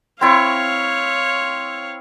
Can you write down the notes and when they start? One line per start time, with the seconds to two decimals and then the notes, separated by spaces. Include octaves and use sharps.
0.21 C4 E4 C#5 F5 C#6